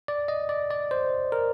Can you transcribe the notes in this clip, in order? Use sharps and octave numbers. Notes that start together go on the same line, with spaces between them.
D5
D#5
D5
D5
C5
A#4